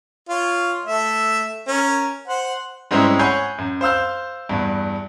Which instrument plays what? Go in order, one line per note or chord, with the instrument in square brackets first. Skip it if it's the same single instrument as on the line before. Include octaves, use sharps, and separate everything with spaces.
[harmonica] F4 C#5
A3 E5
C#4 A#4
C5 F#5
[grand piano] G#2 G3 G#3 C4 C#4 E4
C#5 F#5 G#5 B5 G6 C7
F#2
C5 F5 E6 G6
E2 G2